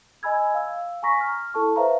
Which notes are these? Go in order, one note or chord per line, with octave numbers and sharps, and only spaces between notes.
D#5 G#5 B5 E6 G#6
F5 E6
G#5 A#5 C#6 A#6 B6
F6
E4 A4 A5 C#6
B4 C5 E5 F5 A#5